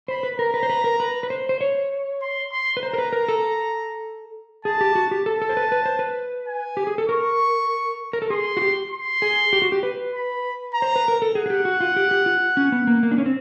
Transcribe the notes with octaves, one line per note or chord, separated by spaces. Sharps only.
C5 B5
B4
A#4 A#5
B4
C5
B4
A#4
B4
B4
C5
C5
C#5
C6
C6
B4
C5 A#5
A#4
B4
A#4
A4
G#4 A5
G4
F#4
G4
A4 A5
A4
C5
B4
B4
C5
B4
G#5
G4
G#4
A4
A#4 C#6
A#4
A4
G#4 C6
F#4
G4
C6
G#4
G4
F#4
G4
B4
B5
A#5
C5
B4
A#4
A4
G#4 F#5
G#4
G4
F#4
F4
G4
G4
F4
C#4
B3
A#3
A#3
D4
C#4
C4